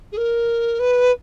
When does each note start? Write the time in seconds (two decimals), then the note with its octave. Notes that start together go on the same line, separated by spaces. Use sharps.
0.12 G#4
0.17 A#4
0.79 B4